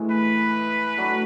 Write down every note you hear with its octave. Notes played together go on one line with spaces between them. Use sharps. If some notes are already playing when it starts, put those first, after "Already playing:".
Already playing: A2 E3 G#3
B4
F#3 A3 D4